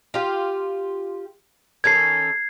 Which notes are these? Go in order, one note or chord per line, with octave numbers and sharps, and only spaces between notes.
F4 G4
D#3 C#4 A4 G#6 C7